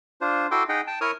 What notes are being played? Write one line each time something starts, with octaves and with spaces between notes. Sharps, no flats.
D4 F4 C5
E4 F#4 A4 G5 C6 D6
D#4 G#4 D#5 F#5 G5
G5 A5
E4 A#4 C#5 C#6 D#6 F6